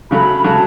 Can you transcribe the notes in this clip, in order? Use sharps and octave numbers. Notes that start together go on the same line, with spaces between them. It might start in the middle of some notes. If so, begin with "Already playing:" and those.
C#3 F#3 A3 B5
B5
C#3 F#3 A3 A5